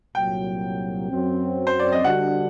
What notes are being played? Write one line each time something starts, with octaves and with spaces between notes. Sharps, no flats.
C2 A#2 F#3 G5
F#2 F#3 C4
C5
D5
D#5
D3 G3 D4 F#4 F#5